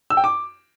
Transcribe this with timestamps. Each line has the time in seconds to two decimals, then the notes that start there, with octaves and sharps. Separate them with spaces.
0.10 E6
0.17 G5
0.24 D6